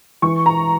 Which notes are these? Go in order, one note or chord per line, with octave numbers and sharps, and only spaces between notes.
E3 C#6
A#5